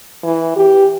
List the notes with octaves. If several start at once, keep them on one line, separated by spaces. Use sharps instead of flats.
E3
G4